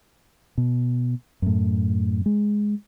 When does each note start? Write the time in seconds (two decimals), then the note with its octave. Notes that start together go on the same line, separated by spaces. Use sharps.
0.58 B2
1.42 F#2 A2
2.26 G#3